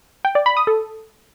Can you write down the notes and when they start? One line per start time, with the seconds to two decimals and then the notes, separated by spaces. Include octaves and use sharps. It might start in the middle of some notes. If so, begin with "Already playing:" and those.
0.25 G5
0.35 D5
0.46 B5
0.57 D#6
0.67 A4